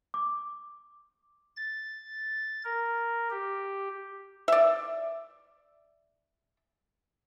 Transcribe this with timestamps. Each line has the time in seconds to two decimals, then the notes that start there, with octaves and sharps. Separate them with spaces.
0.14 D6
1.57 A6
2.64 A#4
3.30 G4
4.48 D5 E5